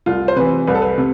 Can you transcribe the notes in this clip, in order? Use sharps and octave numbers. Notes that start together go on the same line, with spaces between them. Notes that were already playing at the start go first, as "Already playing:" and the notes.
C2 F4
C5
C3 E3 B4
C2 B4
A4
B4
C3